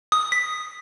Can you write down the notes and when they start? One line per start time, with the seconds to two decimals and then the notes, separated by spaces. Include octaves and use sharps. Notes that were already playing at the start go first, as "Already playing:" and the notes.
0.12 D#6
0.32 B6